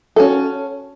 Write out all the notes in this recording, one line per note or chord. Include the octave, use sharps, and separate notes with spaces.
C#4 F#4 A4